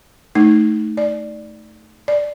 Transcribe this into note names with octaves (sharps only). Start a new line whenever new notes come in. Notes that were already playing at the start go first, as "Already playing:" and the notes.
A3 D#4
D5
D5